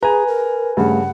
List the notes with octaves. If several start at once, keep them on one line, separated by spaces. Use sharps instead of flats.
G#4 B4 G#5 A#5
A#4
G2 C#3 A3 F#5